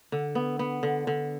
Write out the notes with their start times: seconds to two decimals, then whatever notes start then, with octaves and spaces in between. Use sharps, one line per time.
0.12 D3
0.35 B3
0.59 B3
0.83 D3
1.07 D3